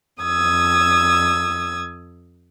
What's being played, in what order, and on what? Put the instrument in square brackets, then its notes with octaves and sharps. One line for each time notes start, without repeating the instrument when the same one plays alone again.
[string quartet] F2 D#6 E6 G#6